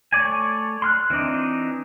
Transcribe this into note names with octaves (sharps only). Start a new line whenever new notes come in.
A3 C#5 D5 G#5
C6 F6 F#6
E3 C4 D4 D#4